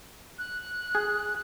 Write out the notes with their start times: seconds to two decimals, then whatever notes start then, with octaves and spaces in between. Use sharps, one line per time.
0.38 F#6
0.95 G#4